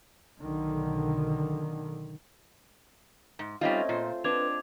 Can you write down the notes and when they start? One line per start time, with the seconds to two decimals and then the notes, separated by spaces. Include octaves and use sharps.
0.39 B1 D3 D#3
3.39 G#2
3.61 G3 A3 C4 C#4 D#4 F4 D#5
3.89 A#2 F4 C5
4.24 C4 D4 B4 D#5 A5 D6 G#6 F7